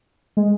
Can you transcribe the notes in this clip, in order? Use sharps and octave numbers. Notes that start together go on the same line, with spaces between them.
G#3